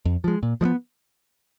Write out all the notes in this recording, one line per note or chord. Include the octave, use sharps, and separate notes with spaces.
F2
F3 G#3
A#2
F3 G#3 B3